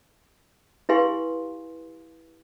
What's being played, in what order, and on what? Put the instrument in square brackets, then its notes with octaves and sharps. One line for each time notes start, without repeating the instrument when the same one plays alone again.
[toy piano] E4 G4 B4 F5 G#5 C6